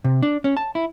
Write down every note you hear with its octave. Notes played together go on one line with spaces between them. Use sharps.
C3
D4
C#4
A5
E4